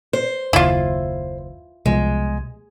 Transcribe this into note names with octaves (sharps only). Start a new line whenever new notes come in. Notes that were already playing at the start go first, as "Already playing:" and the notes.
C5
F#1 D#2 E4 F4
C2 B2 F3 G#3